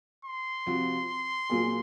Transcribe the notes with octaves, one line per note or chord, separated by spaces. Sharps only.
C6
C3 F3 C4 F#4
A#2 F#3 A#3 F4 G#4